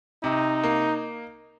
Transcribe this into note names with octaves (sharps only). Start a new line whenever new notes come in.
C3 D#4
A#3